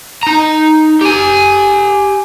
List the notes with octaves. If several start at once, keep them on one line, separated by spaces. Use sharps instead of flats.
D#4 A#5
G4 G#5